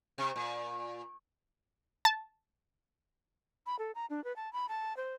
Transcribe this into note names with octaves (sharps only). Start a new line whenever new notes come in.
C3
A#2
A5
B5
A4
A#5
D4
B4
A5
B5
A5
C5